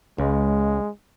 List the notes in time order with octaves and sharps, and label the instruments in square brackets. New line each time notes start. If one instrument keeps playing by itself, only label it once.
[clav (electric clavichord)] C#2 [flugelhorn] G#3